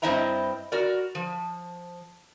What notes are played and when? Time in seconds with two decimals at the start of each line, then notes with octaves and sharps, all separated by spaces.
0.02 G2 C4 E4 D#5 E5 A#5
0.72 F#4 A#4 D5
1.15 F3